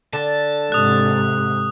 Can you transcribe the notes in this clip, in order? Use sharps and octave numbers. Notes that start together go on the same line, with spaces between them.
D3 A5
G#2 C3 D#6 F#6